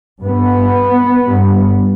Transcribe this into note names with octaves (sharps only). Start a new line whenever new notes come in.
G2 B3
G2